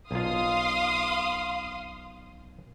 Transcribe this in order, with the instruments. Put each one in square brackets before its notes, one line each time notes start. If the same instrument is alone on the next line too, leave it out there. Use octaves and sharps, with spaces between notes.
[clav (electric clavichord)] B1 F4 [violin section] F5 C6 D#6